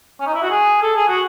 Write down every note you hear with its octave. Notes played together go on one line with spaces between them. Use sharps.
C#4
D#4
E4
F#4
G#4
A4
G#4
F#4